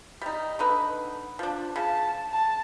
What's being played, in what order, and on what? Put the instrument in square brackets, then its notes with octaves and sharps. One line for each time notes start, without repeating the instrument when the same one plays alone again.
[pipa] G3 D#4
D3 D#4 B4
F3 D4
[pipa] C#3 [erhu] A5
[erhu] A5